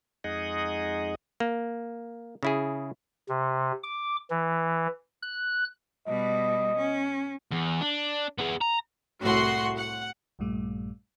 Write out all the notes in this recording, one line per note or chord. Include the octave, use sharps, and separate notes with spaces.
F2 G#3 D#4 G#4 D#5 F#5
A#3
C#3 E4 G#4
C3
D6
E3
F#6
B2 G3 D#5
C#4
E2
D4
B3 G#4
A#5
C2 A2 F#4 F#5 C6
F#5
A#1 G2 A#2 G3 A3